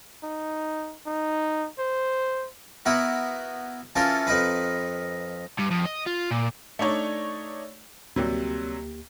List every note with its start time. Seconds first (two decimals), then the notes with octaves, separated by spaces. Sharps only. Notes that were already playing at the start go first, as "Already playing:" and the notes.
0.23 D#4
1.06 D#4
1.79 C5
2.86 B3 E4 F#4 A#4
3.96 E3 C#4 F4 A4 A#4
4.27 F2 D#4 A#4 B4
5.59 G2
5.71 F2
5.86 D#5
6.07 F4
6.31 A#2
6.79 A3 D4 D#4 C#5 D5
8.16 D2 C3 F#3 G3 A#3 G4